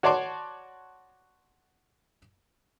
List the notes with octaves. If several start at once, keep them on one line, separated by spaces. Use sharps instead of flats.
F#4 C#5 D5 A5 C6 D6